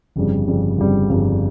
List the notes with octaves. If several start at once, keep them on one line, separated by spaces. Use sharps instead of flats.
G1 F2 C#3 G3
G1 F2 C#3 G3
G1 F2 C#3 G3
G1 F2 C#3 G3